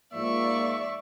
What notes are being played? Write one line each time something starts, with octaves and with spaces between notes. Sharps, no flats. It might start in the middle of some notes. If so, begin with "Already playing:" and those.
G#2 F3 A#3 D5 E5 C#6